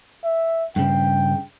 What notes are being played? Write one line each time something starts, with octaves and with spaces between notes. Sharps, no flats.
E5
G2 C#3 G5